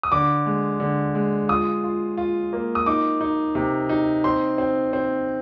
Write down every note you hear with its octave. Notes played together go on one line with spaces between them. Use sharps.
D#6
D3 D6
G#3
D3
G#3
F4 D#6
F4
F4
A#3
D#6
D#4 D6
D#4
C3
D#4
C4 C6
C4
C4